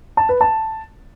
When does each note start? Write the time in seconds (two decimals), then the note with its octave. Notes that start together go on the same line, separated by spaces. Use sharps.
0.17 A5
0.29 B4
0.41 A5